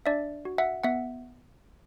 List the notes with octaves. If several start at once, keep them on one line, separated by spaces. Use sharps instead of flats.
D4 D5 E5
F#4
E5 F#5
B3 E5 F#5